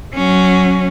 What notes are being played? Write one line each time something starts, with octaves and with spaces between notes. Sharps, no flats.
F#3 C#4